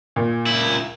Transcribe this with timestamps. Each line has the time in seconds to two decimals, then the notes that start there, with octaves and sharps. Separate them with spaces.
0.16 A#2
0.46 C#2 E4